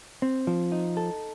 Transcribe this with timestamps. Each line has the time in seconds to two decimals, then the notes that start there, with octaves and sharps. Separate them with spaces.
0.22 C4
0.47 F3
0.72 D#4
0.97 A4